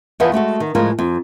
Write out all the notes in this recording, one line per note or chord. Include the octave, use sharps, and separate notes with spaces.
E2 E3 F3 B3 D#5
G#3 A3 F#4 A4
D#3
A2 F3 G#3 F4 A#4
F2